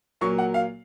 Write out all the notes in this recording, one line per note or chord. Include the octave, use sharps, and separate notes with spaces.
A#2 F#3 A#3 C#6
F#5
F5